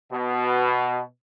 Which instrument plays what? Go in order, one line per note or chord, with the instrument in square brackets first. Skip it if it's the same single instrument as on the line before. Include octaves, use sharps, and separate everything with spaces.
[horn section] B2